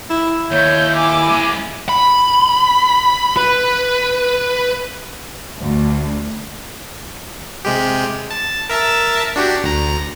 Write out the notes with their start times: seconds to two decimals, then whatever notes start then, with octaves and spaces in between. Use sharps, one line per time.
0.10 E4
0.51 D#2 C#5 G6
0.96 G#5 D6
1.29 G#3 C#4
1.89 B5
3.37 B4
5.60 D2
7.65 C3 G#3 G4
8.31 A5
8.69 A#4 E5 A5
9.36 D4 F#4 G4
9.63 D2 A#5